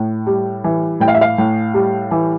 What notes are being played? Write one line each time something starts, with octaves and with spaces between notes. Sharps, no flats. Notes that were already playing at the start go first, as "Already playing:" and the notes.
Already playing: A2
G3
E3
A2 G5
F5
E5
F5
A2
G3
E3